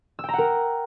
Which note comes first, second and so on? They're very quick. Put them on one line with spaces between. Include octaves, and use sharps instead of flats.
E6 G5 A#5 F#5 A#4